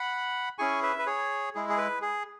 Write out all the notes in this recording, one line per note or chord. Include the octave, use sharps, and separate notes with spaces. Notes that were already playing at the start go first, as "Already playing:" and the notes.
Already playing: F#5 B5
C#4 E4 G#4 G#5 C#6
B4 E5
B4
G#4 C#5
G#3 E4 G#4
G#4
B4
G#4